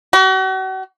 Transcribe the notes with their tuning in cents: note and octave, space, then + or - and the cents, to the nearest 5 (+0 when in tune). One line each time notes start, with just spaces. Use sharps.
F#4 +40